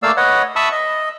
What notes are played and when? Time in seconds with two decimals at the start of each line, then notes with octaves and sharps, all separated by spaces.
0.03 A3 A#3 D5 F5 E6
0.17 B4 C#5 D#5 F#5
0.56 E5 A5 B5 C#6 D#6 E6
0.72 D#5